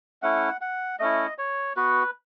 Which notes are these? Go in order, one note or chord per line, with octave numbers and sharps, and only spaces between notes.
A3 C#4 E4 F#5
F#5
A3 C#4 E4 D#5
C#5
B3 F#4 B4